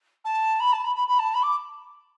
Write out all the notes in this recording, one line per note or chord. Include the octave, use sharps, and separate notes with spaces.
A5
B5
A5
B5
B5
B5
A5
B5
D6